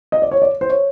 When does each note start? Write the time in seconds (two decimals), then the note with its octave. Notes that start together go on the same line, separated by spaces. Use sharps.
0.12 D#5
0.22 D5
0.31 C#5
0.42 D5
0.61 C5
0.70 C#5